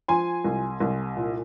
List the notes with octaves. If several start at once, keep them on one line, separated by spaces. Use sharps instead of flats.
F3 G#5 C6
C2
C2
A#2